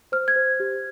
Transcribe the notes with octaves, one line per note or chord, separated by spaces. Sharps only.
C5 F6
G#6
C5
G4